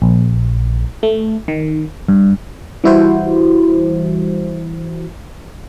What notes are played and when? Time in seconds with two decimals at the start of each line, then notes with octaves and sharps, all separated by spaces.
0.02 A#1
1.03 A3
1.48 D#3
2.08 G2
2.84 E3 G3 E4 F#4 C5